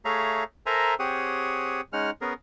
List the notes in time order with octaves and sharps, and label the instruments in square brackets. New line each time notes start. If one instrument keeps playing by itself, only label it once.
[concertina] A3 G#4 C#5 E5 F5 A#5
A4 A#4 C5 E5 G#5 A#5
C4 G4 G#4 C#5 F#5 D#6
G#3 C#4 D#4 F#5 F6
B3 C#4 G#4 A#4